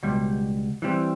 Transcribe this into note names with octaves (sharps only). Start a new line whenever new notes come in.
C#2 B2 G3
E3 G3 C4